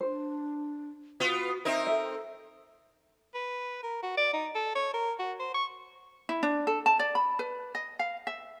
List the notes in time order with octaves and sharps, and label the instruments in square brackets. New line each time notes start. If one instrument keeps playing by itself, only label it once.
[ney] D4 [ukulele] C5
[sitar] B3 F4 [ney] F#4
[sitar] C4 D#4 A#4 [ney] E5
[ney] A4 [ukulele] E5
[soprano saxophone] B4
A#4
F#4
D5
D#4
A4
C#5
A#4
F#4
C5
C#6
[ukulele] E4
D4
A4
A5
D5
B5
B4
D#5
F5
E5